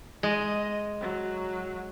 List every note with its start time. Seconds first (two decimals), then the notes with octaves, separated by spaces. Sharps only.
0.23 G#3 D#5
1.01 F#3